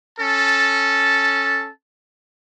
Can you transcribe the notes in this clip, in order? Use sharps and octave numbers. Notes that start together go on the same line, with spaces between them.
C#4 A4 A5